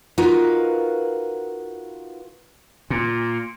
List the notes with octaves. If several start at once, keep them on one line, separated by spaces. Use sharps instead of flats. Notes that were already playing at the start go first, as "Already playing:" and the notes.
D#4 F4 F#4 A#4 B4
A#2